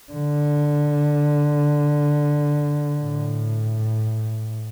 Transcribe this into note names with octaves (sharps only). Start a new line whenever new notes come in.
D3
A2